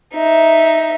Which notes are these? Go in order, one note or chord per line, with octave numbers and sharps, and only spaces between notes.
D#4 E5